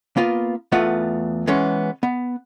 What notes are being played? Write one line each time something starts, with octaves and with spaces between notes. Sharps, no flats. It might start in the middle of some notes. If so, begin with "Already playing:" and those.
A#3 B3 F4
E2 A3 B3 F4 F#5
E3 G#3 B3 C#4
B3